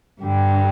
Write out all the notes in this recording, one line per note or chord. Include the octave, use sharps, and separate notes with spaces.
G2 D3 G3